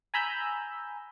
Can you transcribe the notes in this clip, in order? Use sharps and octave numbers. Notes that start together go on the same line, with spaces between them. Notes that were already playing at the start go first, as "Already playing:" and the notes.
G#5 A#5 B5 E6 G6